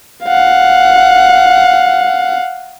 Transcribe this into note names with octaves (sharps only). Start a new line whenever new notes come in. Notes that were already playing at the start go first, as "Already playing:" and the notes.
F5 F#5